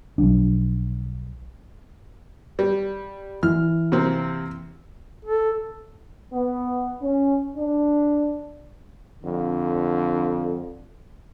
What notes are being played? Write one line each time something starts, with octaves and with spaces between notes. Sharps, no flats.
B1 F3 F#3 D4
G3
E3 F6
C3 A#3 C4
A4
B3
C#4
D4
F2 D3